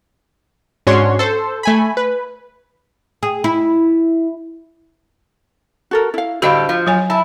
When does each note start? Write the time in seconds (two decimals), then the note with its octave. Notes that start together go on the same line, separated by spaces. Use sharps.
0.87 G#2 C#4 D4 F#4 C#5 C6
1.19 A4 C5
1.63 A3 G#5 B5
1.97 B4
3.23 G#4
3.44 E4
5.91 F#4 A4 A#4
6.14 E4 F5
6.42 A2 D3 G3 F#4 C5 D#5 F5
6.69 F3
6.87 F#3 C#5 G#5
7.10 E4 A5